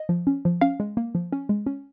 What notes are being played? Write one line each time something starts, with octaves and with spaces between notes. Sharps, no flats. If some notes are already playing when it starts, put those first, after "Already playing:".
Already playing: D#5
F3
C#4
F3
C#4 F5
G#3
A#3
F3
C#4
G#3
C#4